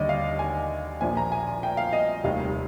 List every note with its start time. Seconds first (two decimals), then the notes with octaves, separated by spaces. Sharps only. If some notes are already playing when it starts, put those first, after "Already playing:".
Already playing: D#2 D3 G3 D5 D#5
0.09 F5
0.39 G#5
1.01 A#1 A#2 F3 G#5
1.17 A#5
1.32 G#5
1.63 G5
1.77 F5
1.93 D#5
2.24 F1 D#2 D#3 G3 F5